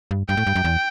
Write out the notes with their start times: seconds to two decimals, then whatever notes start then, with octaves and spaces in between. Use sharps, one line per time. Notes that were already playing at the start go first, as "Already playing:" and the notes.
0.11 G2
0.28 G2 G5
0.37 A2
0.47 G2
0.56 F#2
0.64 E2